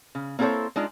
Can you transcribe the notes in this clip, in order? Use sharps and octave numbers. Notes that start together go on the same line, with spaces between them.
C#3
A#3 C4 E4 A4 C5 C#5
G#3 D4 D#4 F4